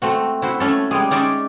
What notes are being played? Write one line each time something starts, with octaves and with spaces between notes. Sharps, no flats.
A3 C4 F#4
E4 F#4 C5
A3 C#4 A4
G3 G#3 G#4
C#4 D#4 D5 E5 C6